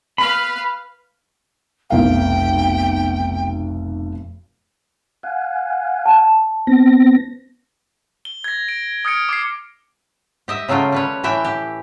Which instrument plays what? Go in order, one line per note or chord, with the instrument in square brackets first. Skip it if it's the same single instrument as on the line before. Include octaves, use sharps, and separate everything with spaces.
[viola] B4 F5 [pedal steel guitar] B5
[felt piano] F1 B1 F5 [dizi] G5
[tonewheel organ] F5 F#5 G#5
[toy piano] A5
[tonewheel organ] B3 C4 A#6
[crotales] G7
G#6 A#6
D7
D#6 F6 G#6 C#7 D7
D6 G#6 C7
[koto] G4 D#5 E5
C#3 F#3 A3 F4 G5
G3 B4 C#5
A2 E3 E5 G5
G4